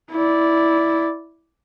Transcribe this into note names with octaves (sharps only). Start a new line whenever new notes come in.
E4 D5